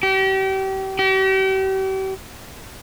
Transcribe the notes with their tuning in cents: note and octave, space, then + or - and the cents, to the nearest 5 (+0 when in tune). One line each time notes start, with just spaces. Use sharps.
G4 -35
G4 -40